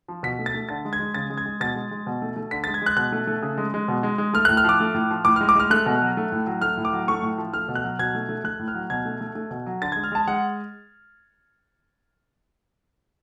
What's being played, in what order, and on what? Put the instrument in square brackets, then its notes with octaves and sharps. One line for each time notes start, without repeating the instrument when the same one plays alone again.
[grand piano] F3
B2 B6
A3
A6
A3
D3 A6
G#3
G#6
G#3
C#3 A6
G#3
G#6
G#3
B2 A6
G#3
G#3
B2
A3
A3
D3 B6
A6
G#3
G#6
G#3 F#6
B2 F#6
A3
A3
C#3
G#3
G#3
B2
G#3
G#3
A3 F6
F#6
A2
F6
F3 D6
A3
A2
F3
A2 D6
F6
G#3
D6
G#3 F6
A3 F#6
B2
F#3
A3
A2
F#3
A3 F6
A2
D6
F#3
A3 C#6
A2
F3
A3 F6
B2
F#6
F#3
B2 G#6
A3
A3
A3 F#6
A2
F6
F#3
B2 G#6
A3
A3
A3
B2
F#3
D3 A6
G#6
G#3
F6
G#3 A5
G#3 F#5